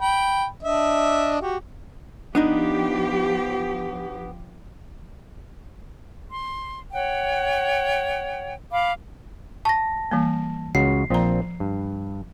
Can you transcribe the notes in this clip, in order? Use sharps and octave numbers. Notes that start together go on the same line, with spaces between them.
G5 B5
D4 D#5 E5
F#4 G4
F3 B3 D4 D#4 G4
C6
C#5 F#5 G5
F5 B5 D6
A5 C#6 A#6
E3 G3 A#3
C#2 C#3 F#4 C7
A#1 F3 C4 F4 A#5
G2